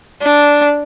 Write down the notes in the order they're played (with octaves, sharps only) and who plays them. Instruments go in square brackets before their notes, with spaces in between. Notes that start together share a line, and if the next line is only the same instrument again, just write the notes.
[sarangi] D4